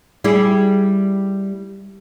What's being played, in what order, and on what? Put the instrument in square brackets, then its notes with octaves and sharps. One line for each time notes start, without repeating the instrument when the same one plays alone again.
[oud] G3 E4 G#4